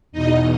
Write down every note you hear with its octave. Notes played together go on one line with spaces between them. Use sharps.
E2 B2 D#4 D#5